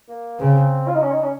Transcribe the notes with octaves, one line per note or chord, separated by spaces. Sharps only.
A#3
C#3 C4
F4
D#4
C#4
D#4
C#4